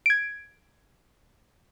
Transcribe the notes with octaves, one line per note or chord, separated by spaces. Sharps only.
G#6 D7